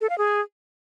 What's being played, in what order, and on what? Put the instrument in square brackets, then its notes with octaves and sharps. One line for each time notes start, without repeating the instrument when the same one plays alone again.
[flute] A4
F5
G#4